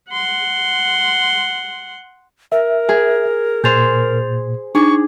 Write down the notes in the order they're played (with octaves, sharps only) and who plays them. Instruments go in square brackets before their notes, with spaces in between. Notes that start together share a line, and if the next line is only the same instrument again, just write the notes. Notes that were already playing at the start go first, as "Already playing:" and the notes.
[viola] F#5 C6
[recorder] A#4 [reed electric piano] E5
[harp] G#4
[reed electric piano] A#2 [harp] G#4 C5 [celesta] G6 A6 F7
[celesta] D4 D#4 D6 [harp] G#4 [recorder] C#6